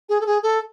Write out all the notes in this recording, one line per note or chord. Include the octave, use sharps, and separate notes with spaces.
G#4
A4
G#4
A4